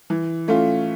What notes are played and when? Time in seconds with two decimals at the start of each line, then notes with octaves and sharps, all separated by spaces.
0.10 E3
0.48 A3 C#4 F4